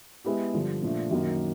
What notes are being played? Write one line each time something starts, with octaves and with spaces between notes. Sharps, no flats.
G#3 B3 E4 G4
G2 D3 F3
A#2 F3 A3 D4
F#2 D#3 F#3 A#3